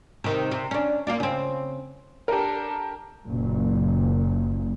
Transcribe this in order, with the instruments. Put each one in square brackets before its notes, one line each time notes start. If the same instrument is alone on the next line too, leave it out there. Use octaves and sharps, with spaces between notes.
[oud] C3 D#3
C3
C#4 D4
A#3 F4 D5
C#3 C4
[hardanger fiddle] D4 A4 [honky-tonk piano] G4 A#4
[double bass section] F#1 A#2